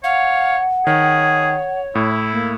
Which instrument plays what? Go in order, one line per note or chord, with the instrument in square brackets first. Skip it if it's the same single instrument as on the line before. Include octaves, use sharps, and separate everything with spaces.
[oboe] C#5 [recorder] F5 [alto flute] F#5
[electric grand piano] D#3 [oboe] G#4 [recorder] C#5
[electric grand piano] A2 [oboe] E4
[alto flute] A#3